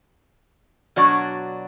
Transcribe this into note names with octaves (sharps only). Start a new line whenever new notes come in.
B2 F#3 D4 F#4 D5